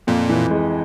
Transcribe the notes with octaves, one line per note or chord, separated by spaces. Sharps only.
F2 A#2
E3
G#3